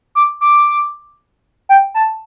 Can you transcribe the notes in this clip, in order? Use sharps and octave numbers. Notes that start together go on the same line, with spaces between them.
D6
D6
G5
A5